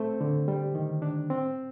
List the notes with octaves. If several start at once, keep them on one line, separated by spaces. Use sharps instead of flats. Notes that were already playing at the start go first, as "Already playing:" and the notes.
Already playing: A3 C4 C5
D3
G3
D#3
D4
C4